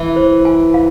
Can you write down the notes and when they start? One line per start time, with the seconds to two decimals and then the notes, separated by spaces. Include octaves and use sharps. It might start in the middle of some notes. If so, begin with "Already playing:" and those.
Already playing: E3 E5
0.16 C5
0.45 G#5
0.74 F5